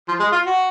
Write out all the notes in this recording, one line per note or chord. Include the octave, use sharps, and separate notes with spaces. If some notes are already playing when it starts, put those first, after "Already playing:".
F3
G#3
F4
F#4